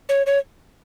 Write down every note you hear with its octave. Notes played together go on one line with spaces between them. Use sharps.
C#5
C#5